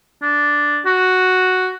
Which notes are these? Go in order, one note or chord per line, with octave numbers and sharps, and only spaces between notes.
D4
F#4